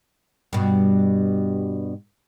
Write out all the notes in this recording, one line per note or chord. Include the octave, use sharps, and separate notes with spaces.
G2 B2